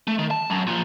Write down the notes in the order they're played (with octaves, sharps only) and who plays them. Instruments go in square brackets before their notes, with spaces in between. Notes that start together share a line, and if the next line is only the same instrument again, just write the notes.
[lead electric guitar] A3
D#3
A5
F#2
A#2 F3